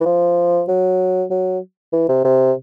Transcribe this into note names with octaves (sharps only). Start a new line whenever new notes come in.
E3
F3
F#3
F#3
E3
C3
C3